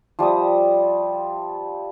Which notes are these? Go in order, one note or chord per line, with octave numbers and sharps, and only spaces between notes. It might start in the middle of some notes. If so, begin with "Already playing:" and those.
F3 G3 E5 D#6